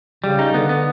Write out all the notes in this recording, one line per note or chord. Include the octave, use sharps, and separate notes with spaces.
C#3 G3
D#4
D3 B3
B3